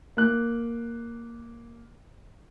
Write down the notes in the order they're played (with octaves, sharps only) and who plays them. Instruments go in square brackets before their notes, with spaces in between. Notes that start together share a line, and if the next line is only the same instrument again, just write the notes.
[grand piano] A#3 F#6